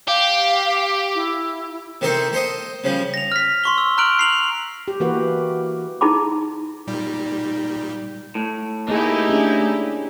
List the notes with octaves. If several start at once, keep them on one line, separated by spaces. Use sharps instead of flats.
G4 F5
E4
C3 D#3 C4 D#4 A4 C5
A4 C5 D#5
C#3 F3 G3
A#6 F7
F6 B6
C6 C#6 G7
E6
A#5 F6 F#6 D7 F7 F#7
C7 F7 F#7
G4
E3 A#3 F#4 B4
D#4 E4 G#4 A5 B5 D6
A#2 G3 D#4
A2
A3 A#3 D#4 E4 G4 G#4
C#4 D4 G#4